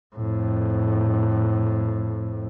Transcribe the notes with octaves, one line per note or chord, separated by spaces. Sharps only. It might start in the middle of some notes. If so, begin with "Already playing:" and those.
F2 A2